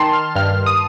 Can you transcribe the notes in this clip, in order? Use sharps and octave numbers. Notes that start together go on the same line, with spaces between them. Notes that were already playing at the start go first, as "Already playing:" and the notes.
Already playing: D#3 A5 C6
F6
G2 F6
D#6